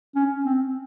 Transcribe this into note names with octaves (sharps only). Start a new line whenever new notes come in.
C#4
C4